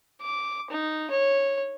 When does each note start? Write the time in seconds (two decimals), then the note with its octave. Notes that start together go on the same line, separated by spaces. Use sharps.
0.21 D6
0.70 D#4
1.11 C#5